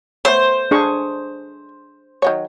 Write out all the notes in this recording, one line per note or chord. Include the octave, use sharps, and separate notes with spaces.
A3 B3 C5 C#5
D4 G#4 C#6
D#3 F#3 C#5